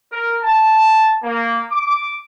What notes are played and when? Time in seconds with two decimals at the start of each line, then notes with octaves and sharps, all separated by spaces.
0.11 A#4
0.43 A5
1.23 A#3
1.71 D6